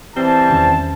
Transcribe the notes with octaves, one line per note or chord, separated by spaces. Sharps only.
E3 G3 C4 A5
E2 D#3 C#4